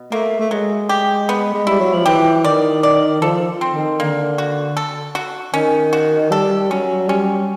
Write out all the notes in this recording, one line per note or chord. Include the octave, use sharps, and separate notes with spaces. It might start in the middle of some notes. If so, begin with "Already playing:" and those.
Already playing: B2
A3 A#3
A3
F#3 G#3
G4
B3
G#3
G3 E4
F#3
F3
E3 G4
D#3 D5
D5
F3 A4
C4
D#3
D3 A#3
F#4
A4
F#4
D#3 C#4
F#4
G3 A4
F#3 C#4
G3 C#4